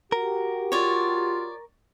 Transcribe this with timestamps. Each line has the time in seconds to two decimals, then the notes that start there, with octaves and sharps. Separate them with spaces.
0.12 F#4 G4 A#4
0.72 F4 C#5 D5